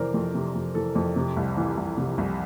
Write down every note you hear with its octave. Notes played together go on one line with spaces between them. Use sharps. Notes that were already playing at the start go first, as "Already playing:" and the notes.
Already playing: F2 C3 E3 A#4 C5 D5
F2
C3
F2
E3 A4
F2
C3
C2
E3
C2
C3
C2